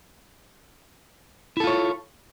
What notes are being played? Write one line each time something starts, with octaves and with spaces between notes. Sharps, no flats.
E4 F4 A4 C#5